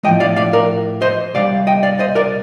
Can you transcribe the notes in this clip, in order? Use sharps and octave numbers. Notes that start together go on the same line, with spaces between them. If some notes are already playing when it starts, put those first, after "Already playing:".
A2 F3 A3 D#5 G5
D5 F5
D5 F5
A#4 D5
C5 D#5
C2 C3 G3 D5 F5
D#5 G5
D5 F5
C5 D#5
A#4 D5